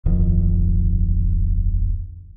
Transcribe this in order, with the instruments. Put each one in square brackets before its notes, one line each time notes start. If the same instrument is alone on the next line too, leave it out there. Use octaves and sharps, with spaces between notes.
[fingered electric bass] D1 G1 F2 D#3